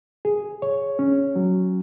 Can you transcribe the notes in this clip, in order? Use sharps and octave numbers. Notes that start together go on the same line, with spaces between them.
G#4
C#5
C#4
F#3